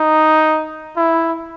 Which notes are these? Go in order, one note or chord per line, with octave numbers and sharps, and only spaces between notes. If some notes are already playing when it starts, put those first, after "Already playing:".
Already playing: D#4
E4